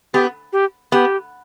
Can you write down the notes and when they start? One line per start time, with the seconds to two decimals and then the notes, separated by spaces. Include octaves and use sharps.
0.14 B3 G4
0.53 G4
0.92 B3 G4